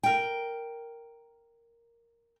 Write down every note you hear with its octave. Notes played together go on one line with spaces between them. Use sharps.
A#4 G5